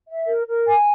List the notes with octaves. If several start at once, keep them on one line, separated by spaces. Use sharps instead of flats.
E5
A#4
A#4
G#5